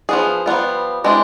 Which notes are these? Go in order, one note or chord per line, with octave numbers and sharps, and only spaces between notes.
F3 B3 G#4
F3 G3 B3 F4
G#3 C4 D4 E4